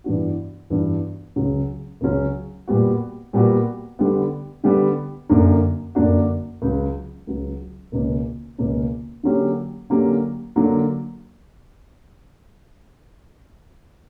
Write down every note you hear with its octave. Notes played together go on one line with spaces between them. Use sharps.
G2 E3 B3 D4 F#4
G2 E3 B3 D4 F#4
C#2 C#3 F#3 C#4
C#2 C#3 F#3 C#4
A#2 G3 B3 F#4
A#2 G3 B3 F#4
D3 G3 B3
D3 G3 B3
F#2 D3 A#3 D4 F#4
F#2 D3 A#3 D4 F#4
C#2 C#3 F#3
C#2 C#3 F#3
C#2 B2 A#3 C#4
C#2 B2 A#3 C#4
D3 F#3 A#3 C#4 G4
D3 F#3 A#3 C#4 G4
D3 F#3 A#3